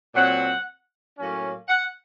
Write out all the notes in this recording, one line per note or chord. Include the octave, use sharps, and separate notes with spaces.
A#2 F#3 C4 F#5
A2 F#3 A#3 C#4
F#5